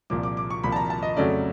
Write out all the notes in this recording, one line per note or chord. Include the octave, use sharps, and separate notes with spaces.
C2 A#2 F3 D6
D6
D6
C#6
C2 A#2 F3 B5
A5
A#5
A5
D#5
F2 C#3 F#3 A3 C#4 D5